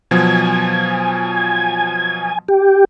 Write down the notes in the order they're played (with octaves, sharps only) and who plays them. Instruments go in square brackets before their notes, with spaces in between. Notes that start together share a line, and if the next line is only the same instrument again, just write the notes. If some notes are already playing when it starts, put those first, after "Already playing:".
[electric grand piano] B2 F3 F#3 [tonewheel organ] G#5
[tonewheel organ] G4